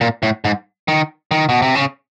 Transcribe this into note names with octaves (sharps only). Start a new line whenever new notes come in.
A#2
A2
G#2
D#3
D#3
B2
C3
C#3